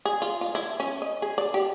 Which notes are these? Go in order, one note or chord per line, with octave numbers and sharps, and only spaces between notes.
G#4
F4
F4
E4
C#4
D#5
G#4
D5
G4